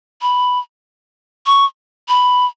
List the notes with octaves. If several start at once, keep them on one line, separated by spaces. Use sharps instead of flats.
B5
C#6
B5